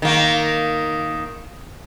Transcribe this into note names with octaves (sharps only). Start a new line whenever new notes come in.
D#3 A#3